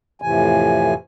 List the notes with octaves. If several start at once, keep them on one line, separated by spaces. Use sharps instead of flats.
F2 A2 C3 E3 G#5